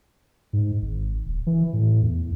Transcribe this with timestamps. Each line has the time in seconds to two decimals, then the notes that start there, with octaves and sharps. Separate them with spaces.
0.53 G#2
0.82 G#1
1.25 D#1
1.47 E3
1.73 A2
2.03 E2